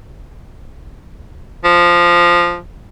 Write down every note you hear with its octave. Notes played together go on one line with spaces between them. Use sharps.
F3